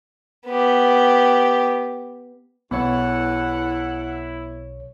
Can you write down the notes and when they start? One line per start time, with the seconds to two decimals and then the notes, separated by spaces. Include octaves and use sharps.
0.46 B3 G4
2.71 B1 E2 B3 E4 A4 C#5 F#5